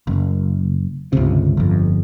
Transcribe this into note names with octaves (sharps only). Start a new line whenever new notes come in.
F#1
G1 C#2 C3
G1 F2